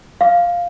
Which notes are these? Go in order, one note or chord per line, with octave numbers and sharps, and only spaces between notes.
F5